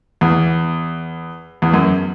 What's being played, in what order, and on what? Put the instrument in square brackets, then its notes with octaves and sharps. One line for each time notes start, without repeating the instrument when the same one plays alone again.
[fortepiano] E2
E2
F#2